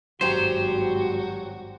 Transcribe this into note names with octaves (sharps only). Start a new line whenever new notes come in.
G#1 G2 F#3 F#4 G4 C5